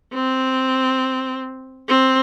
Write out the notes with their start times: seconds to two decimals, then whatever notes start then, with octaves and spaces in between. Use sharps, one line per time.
0.14 C4
1.89 C4